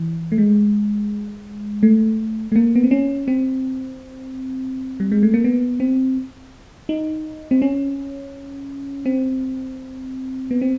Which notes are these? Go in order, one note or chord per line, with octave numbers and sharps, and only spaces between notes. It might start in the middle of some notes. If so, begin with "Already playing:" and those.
Already playing: E3
A3
G#3
A3
A3
A#3
B3
C4
C#4
C4
G3
G#3
A3
A#3
B3
C4
D#4
C4
C#4
C4
B3
C4